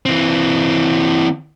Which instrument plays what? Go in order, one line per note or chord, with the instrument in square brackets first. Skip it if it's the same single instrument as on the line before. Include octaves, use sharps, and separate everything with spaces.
[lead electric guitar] E3 C4